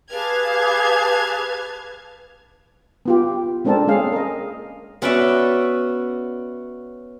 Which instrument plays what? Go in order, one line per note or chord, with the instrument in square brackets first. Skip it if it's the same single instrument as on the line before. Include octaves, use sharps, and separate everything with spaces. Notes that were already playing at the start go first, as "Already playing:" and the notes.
[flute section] G4 G#4 F5 [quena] B4 [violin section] A5 F6 G#6
[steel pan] B3 F4 G4
G#3 C4 D4 A4 A#4 A5
G#3 A#3 C#4 G#4 F5
A#4 D#5
[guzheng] B3 C#4 F#4 D5 E5